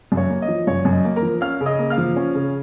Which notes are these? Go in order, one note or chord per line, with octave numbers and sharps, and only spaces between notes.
F#2
C#5
A#3
D#5
F3
F#2 C#5
F#2
D#5
A#3
A#4 A#5
F3
C#4 F5 F6
C#3
D#5 D#6
A#3
F5 F6
F3
C#4
C#3